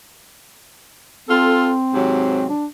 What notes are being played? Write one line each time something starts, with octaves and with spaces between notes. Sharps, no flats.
C4 F4 A4
G#2 C3 F#3
D4